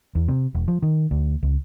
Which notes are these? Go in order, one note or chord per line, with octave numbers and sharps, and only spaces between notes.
E2
C3
E1
F3
D#3
D2
C#2